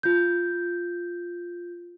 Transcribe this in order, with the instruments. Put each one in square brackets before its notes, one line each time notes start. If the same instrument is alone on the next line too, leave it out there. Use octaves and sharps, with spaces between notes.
[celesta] F4 G6